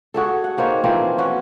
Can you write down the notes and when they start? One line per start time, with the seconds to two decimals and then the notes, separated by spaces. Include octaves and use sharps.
0.14 F#4 G#4 A4
0.44 F#5
0.57 D#3 A#3 C5 C#5
0.84 E3 F3 A#3 C4
1.18 C#4 F#4 B4